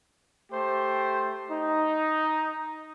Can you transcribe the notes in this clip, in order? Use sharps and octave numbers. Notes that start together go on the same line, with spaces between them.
A3 G4 C5
D#4